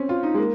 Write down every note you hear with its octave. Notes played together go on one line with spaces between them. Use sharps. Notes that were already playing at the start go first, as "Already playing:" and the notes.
Already playing: C4 C#4
F4
D#4
G#3
A#3